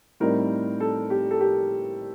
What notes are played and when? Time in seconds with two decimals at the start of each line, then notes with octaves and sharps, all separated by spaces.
0.20 A2 G3 C4 D#4 A#4
0.80 A4
1.10 G4
1.31 A4
1.40 G4